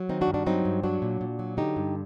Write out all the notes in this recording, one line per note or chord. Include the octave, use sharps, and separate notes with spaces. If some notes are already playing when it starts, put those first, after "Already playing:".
Already playing: F#3
D#3 C4 D#4
D4 F#4
G2
D4 F#4
F#3 C4 D#4
G2
F#3 D4 F#4
A#2
A#2
F#3
D3 D#4 G4
G2